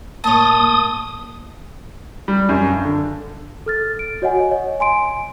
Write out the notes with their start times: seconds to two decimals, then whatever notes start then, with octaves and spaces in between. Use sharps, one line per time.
0.24 A2 A#3 C#5 A5 D#6
2.28 G3
2.49 F#2
2.68 G2
2.85 D3
3.66 A4 F6 A6
3.99 D7
4.22 F#4 C#5 D#5 F#5 G#5
4.51 C#5 D#5
4.80 G#5 C6 D7